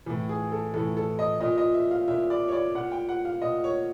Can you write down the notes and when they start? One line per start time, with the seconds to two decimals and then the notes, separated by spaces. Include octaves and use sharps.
0.06 A2 E3
0.29 G#4
0.52 A4
0.74 A2 E3 A4
0.97 A4
1.19 D#5
1.40 A#2 D#5
1.58 D#5
1.74 E5
1.91 F5
2.08 A#2 E5
2.30 D5
2.48 C#5
2.53 D5
2.75 A#2 F#5
2.92 G5
3.09 F#5
3.25 F5
3.42 A#2 D#5
3.64 C#5